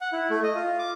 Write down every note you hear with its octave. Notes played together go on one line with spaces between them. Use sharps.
F#5
E4
A3
D#5
F4
D6